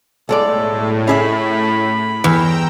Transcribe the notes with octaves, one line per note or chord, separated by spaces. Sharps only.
B1 A2 G#3 A4 D5
C#4 G#4 E5 B5
E2 G2 G5 A#5 E6